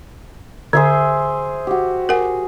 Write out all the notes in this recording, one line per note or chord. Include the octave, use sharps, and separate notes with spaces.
D3 G#4 C5 E5
F#4 G4
G#4 A#4 F#5